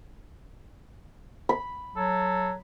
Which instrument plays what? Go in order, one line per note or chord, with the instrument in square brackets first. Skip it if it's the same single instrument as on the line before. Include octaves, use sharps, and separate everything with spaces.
[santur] B5
[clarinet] F#3 [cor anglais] A4